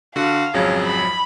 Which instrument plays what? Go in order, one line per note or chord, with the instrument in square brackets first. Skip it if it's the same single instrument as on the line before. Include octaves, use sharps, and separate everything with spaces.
[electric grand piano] D3 [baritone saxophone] F#4 [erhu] F5
[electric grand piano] G#1 F2 F#3 [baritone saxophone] C#3
[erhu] B5